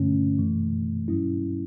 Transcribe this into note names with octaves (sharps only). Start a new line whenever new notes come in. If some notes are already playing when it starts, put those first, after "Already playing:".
Already playing: G2 D3 A3 C#4
F#2 E3 A3
G2 F#3 C#4 E4